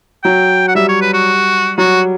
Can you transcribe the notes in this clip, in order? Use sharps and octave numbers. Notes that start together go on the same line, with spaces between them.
F#3 G5
F#5
G3 E5
C#5
B4
F#4
F#3 F#4